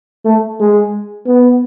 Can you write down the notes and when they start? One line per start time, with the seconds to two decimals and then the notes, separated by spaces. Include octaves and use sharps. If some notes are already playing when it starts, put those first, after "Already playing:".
0.25 A3
0.60 G#3
1.26 B3